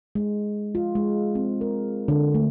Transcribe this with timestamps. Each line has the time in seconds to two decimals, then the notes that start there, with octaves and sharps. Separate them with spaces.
0.15 G#3
0.75 F4
0.95 G#3
1.35 C4
1.61 A#4
2.08 D3
2.34 A3